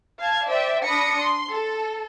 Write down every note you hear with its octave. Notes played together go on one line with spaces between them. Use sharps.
F5 A5 G#6
C5 D5 E5 G5
D4 B5 D#6 A#6 C#7
C6
A4